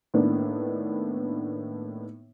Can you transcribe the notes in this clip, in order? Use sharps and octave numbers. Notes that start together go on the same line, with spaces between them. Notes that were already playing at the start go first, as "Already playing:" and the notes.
A2 D#3 A#3 B3 D4